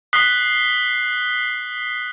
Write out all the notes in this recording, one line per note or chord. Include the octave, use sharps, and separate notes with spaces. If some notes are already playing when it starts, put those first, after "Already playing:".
D#6 F#6 B6 C7 G7